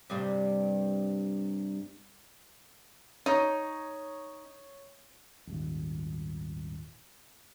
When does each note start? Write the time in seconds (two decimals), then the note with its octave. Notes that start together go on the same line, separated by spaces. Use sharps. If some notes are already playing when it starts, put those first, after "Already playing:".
0.10 G2 C3 G3
3.26 D#4 C#5
5.47 D#1 G#1